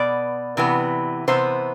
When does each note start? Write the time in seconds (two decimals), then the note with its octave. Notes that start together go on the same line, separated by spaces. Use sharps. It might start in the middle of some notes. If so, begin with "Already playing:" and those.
Already playing: B2 B3 D5
0.57 C3 E3 B3
1.28 C3 E3 B3 C5